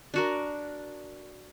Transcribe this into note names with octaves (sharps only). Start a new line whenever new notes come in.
D4 F#4 A#4